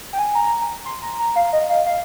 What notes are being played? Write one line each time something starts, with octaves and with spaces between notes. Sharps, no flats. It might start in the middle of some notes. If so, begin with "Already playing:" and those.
G5
G#5
A#5
C6
A#5
A#5
F5
D#5
F5
F5